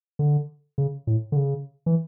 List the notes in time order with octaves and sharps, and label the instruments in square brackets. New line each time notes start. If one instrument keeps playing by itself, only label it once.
[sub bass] D3
C#3
A2
D3
C#3
E3